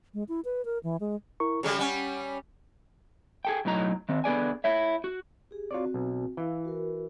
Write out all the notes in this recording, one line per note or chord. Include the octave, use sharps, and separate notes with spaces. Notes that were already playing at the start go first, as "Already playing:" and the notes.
G#3
E4
B4
A#4
E3
G#3
E4 A#4 C#6
C#3 F#3 G3 G#4 A4
G3 C#4 F#5 G#5
G#4 A4 G5
B1 A2 F#3 D#4 A#5
D#3 C4
D3 B3 G#4 D5 G#5
E4 C#5 E5
F#4
G4 G#4
C4 F4 F#4 C#5 D5
B1
E3 E4 F5
F#4 A#4